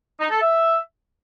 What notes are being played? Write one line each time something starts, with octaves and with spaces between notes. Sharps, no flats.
D#4
A4
E5